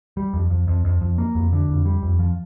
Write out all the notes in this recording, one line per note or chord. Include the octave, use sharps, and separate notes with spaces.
G3
F2
F2
F2
F2
F2
A#3
F2
D3
F2
G3
F2
F3